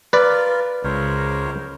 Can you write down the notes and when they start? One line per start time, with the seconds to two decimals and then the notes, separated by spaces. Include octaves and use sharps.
0.13 F4 A#4 B4 D5
0.84 C#2 A#4 C5 C#5